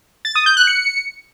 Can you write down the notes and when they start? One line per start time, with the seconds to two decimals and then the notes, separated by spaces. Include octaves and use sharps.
0.25 A6
0.35 D#6
0.46 G6
0.57 F#6
0.67 C#7